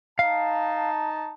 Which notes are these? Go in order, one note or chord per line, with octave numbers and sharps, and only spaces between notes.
D#4 F5 A5